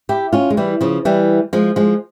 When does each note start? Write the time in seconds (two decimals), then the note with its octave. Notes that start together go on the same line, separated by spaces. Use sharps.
0.09 E4 G4
0.33 C#4 F4
0.50 G#3
0.57 E3 G3
0.81 C#3 F3
1.05 E3 G3
1.53 F3 G#3
1.76 F3 G#3